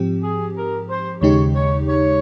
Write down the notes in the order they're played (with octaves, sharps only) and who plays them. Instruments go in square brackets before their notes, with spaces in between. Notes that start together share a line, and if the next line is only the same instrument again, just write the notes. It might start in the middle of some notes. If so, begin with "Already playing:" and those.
Already playing: [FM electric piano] G#2 F3 C4 G4
[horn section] G#4
A#4
C5
[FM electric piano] D#2 C#3 G#3 D#4 G4 [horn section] C#5
[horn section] C#5
C#5